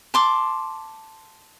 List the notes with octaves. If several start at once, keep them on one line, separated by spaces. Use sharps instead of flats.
A5 C6 D6